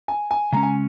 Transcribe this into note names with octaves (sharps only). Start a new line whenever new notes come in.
G#5
G#5
C#3 G#3 C#4 A#5
G#5